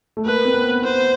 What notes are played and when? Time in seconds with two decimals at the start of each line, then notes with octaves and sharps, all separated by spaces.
0.17 A3
0.26 A#3 B4
0.45 C4
0.54 B3
0.69 B3
0.84 C5